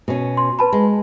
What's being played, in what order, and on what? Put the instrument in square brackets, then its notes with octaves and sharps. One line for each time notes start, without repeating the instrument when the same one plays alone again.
[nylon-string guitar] B2 C#4
[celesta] C6
B4 A5 B5
[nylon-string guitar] G#3